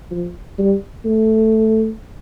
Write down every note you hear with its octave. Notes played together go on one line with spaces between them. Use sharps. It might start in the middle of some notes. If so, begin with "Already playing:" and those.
F3
G3
A3